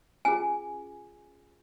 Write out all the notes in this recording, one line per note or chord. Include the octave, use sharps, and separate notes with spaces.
C#4 F4 G#4 G#5